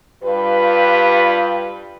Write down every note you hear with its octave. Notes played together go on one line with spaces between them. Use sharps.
G2 F4 G4 B4